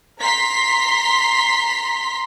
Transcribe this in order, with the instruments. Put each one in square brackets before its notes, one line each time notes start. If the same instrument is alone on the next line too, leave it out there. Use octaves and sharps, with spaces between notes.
[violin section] A#5 C6 B6